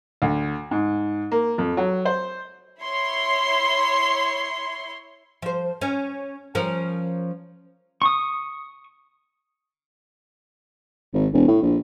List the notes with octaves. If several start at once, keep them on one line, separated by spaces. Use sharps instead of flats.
D2
G#2
A#3
F2
F#3
C5
E4 C#5 C6
F3 C5
C#4
F3 C#4 A#4
C#6 D#6
G#1
E1
A2
A#1